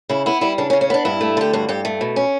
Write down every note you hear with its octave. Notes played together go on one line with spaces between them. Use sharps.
C#3 E4
B3 E4
G3 E4
C#3 D4
C#4
C#3
C#4
B3 D4
G2 E4
A3
D3 G4
G2 F#4
G2 G4
A3
B2
C#4